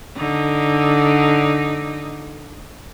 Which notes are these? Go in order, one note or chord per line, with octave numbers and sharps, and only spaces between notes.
D3 D#4